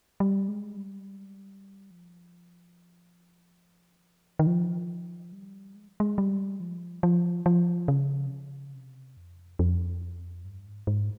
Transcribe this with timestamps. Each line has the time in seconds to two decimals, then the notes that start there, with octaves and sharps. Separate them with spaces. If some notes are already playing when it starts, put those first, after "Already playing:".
0.20 G3
0.48 G#3
0.77 G3
1.91 F3
4.39 D#3
4.47 F3
5.32 G3
5.75 G#3
6.00 G#3
6.18 G3
6.60 F3
7.03 F3
7.46 F3
7.88 C#3
8.26 C3
8.32 C#3
8.74 C3
9.17 F2
9.59 F2
10.45 G2
10.66 G#2
10.87 G#2